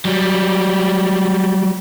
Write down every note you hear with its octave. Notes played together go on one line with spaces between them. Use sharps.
F#3 G3